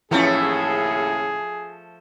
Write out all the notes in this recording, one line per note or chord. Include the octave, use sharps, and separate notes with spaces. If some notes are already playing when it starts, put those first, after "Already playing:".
D#2 A2 C#3 E3 F3 A3 C#4 G#4